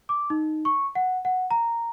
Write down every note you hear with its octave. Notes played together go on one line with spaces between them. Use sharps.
D6
D#4
C#6
F#5
F#5
A#5